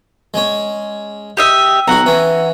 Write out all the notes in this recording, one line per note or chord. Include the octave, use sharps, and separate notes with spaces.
G#3 C#4
G4 D#5 E5
B1 F#4 F#5 A#5
E3 C#4